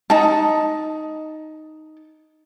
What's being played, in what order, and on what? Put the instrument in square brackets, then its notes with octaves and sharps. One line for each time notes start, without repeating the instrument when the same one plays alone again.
[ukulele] D#4 A5